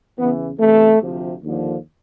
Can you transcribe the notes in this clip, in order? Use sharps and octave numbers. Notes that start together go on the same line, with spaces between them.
E2 C#3 E3 B3
E2 C3 E3 A3
D2 C3 F3
D#2 D3 F3